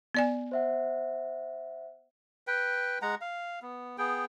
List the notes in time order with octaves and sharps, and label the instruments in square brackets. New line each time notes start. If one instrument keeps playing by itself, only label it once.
[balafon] B3 D5 G#5
[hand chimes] C5 E5 F#5
[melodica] B4 G5
G#3 F#5 A#5
F5
B3
B3 G#4 G5